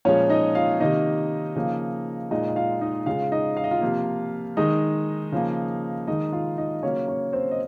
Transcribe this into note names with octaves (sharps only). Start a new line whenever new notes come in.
A#2 F3 G#3 C#4 C#5
D#4 D#5
F4 F5
C3 D#3 A#3 D#4 D#5
C#3 F3 A#3
A#2 G#3 D#4 D#5
D#5
F4 F5
D#4 D#5
C#3 G#3 F4 F5
D#4 D#5
F5
D#5
F4 F5
C3 F3 A#3
D#3 G#3 D#4 D#5
C#3 F3 A#3
D#3 G#3 D#4 D#5
F4 F5
D#4 D#5
C#3 F#3 A#3 C#4 C#5
C#4 C#5
C4 C5
D#5